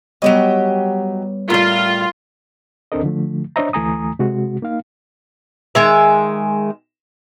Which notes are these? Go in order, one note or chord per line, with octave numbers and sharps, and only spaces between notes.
F#3 G3 B3 G4 C#5 D#5
A2 G3 F4 A#4 C6
D2 C4 D4 A4 A#4 D#5
D3 F3 A3
D4 C5 C#5 D#5 E5 A#5
D2 E3 A3 G#5 A#5 D#6
C3 G#3 F#4
A#3 D#4 F5
D#3 G#3 E5